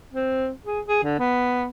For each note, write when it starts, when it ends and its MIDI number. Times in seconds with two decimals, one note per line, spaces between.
0.13 0.51 60
0.65 0.80 68
0.89 1.00 68
1.04 1.17 50
1.19 1.68 59